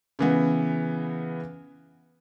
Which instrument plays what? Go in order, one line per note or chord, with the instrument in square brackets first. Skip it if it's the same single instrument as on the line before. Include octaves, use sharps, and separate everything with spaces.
[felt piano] C#3 E3 B3